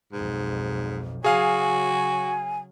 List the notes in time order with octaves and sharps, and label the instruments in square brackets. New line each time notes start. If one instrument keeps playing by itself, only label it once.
[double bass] B1 F2 [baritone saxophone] G#2
[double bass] C#3 F#3 [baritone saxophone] F#4 [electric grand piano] G#4 F5 D#6 [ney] G#5